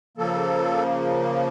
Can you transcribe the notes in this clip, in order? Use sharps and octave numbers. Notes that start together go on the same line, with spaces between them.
C#3 F3 A#3 A4